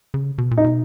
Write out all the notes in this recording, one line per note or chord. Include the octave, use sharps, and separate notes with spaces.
C#3
B2
A#2
D#4
B2